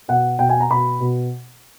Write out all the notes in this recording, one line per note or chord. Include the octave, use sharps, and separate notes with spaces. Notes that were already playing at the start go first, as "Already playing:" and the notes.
B2 F#5
B2 G5
G#5
A#5
B2 B5
B2